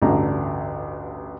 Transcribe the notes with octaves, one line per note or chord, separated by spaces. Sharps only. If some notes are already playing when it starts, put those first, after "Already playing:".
A1 D2 G2 D3 D4 A#5